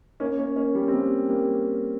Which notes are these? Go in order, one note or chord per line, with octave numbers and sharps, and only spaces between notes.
A#3 C#4
A#3 C#4
A#3 C#4
G3 A#3
C4
G3 A#3
G3 A#3